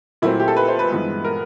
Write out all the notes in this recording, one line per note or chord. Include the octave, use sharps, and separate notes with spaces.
A#2 F#3 A3 C4 E4
G4
A4
B4
C5
B4
G2 E3 G#3 B3
A#4